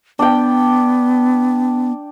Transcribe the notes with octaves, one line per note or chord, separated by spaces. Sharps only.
B3 D4 G5